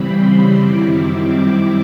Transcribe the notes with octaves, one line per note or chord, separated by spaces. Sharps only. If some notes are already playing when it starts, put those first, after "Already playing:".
Already playing: C#3 E3 G3 C4 B5
C6
F#2 D#3 G3 C4 E4 D6
D6